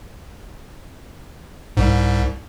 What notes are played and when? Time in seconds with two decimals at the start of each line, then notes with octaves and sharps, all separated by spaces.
1.77 C2 G#2